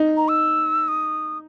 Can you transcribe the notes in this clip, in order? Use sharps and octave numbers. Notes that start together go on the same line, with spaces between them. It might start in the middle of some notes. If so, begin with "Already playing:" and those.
Already playing: D#4
A#5
E6
D#6